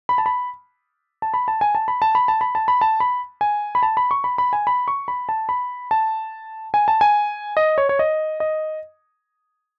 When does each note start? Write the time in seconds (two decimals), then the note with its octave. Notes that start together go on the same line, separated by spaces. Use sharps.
0.09 B5
0.18 A5
0.26 B5
1.22 A5
1.34 B5
1.48 A5
1.61 G#5
1.75 A5
1.88 B5
2.02 A5
2.15 B5
2.28 A5
2.41 B5
2.55 A5
2.68 B5
2.81 A5
3.00 B5
3.41 G#5
3.75 B5
3.83 A5
3.97 B5
4.11 C#6
4.24 B5
4.38 B5
4.53 G#5
4.67 B5
4.88 C#6
5.08 B5
5.29 A5
5.49 B5
5.91 A5
6.74 G#5
6.88 A5
7.01 G#5
7.57 D#5
7.78 C#5
7.89 C#5
7.99 D#5
8.40 D#5